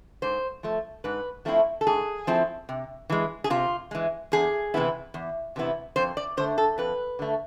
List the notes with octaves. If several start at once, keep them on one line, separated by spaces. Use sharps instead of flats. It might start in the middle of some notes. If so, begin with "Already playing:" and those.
G#2 C5
F3 A3
G#2 B4
F3 A3 C4 E4
A4
G#2 G#4
F3 A3 C4 E4
C3
E3 G#3
G#4
C3 F4
E3 G#3
E2 G#4
C3 E3 B3 E4
E2
C3 E3 B3 E4
F2 C5
D5
D3 A3 C5
A4
F2 B4
D3 A3